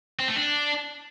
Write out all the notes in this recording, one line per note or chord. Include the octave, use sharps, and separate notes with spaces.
C4
A3
D4